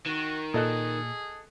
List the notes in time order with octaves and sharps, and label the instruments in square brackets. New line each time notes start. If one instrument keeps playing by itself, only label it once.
[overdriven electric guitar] D#3 [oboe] F#4
[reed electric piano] A#2 [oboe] G#4 [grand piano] A4 D#5 F#6